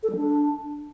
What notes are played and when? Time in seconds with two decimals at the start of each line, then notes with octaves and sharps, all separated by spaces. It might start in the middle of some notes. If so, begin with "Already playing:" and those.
0.03 A4
0.10 G3
0.16 D4